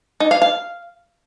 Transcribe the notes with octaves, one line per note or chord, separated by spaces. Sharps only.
D#4
F5
F5